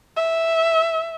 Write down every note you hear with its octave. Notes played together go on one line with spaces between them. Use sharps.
E5